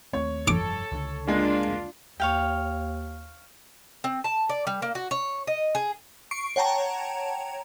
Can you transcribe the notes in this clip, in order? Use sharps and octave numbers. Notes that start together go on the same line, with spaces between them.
D#2 A3 C4 C#5
F1 G2 F3 A4 D6
C#2 D3
G#3 A#3 D4 F4
D#2 C#5 F5 G5
C4
A5
D5
G3
A#3
F#4
C#5
D#5
G#4
C#6 C7 D7
C#5 F#5 G5 A5 A#5